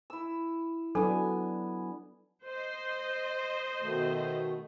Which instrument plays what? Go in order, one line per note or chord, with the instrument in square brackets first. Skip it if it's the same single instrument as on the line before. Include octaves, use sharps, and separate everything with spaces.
[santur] E4 E6
[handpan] F#3 D4 [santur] B3 G#5 [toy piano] A4
[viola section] C5 D#5
[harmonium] B2 D#3 A3